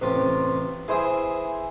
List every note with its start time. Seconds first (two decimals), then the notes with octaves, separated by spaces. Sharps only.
0.02 A1 C3 F4
0.88 E3 G#4 C5 E5 G#5 D#6